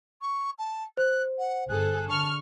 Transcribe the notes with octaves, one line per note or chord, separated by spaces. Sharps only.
C#6
A5
C5 F#6
F#5
G1 G#4 A4 F#6
D3 A5 C#6 F6